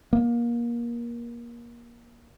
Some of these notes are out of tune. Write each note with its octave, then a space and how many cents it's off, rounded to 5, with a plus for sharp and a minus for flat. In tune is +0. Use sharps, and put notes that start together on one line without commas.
A#3 +25